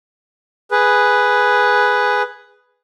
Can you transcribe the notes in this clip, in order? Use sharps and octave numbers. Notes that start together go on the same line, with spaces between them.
G#4 B4